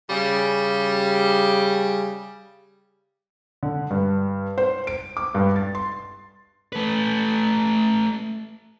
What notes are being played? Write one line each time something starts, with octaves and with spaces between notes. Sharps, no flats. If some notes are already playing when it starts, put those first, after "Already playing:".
C#3 G3
D3
G2
C5
D7
D6
G2
A6
C6
A3 B4